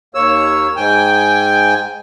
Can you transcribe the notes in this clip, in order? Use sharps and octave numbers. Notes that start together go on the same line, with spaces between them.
D#2 A#3 C#5 E6
G#2 G5 G#5